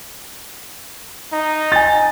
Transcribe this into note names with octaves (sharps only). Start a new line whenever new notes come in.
D#4
G#5 A6